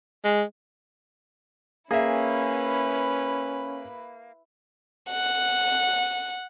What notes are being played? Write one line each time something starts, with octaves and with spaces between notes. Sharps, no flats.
G#3
A#3 C#4 E4 G#4 B4 E5
F#5